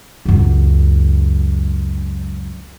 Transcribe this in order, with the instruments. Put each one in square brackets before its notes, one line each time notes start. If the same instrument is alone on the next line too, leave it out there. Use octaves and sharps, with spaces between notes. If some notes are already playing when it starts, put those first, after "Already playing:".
[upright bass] C#2 F#2